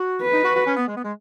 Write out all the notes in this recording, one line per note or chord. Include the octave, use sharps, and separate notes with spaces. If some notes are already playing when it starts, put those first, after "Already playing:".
Already playing: F#4
B4
D#4
F#4
F#4
C#4
B3
G#3
B3
G#3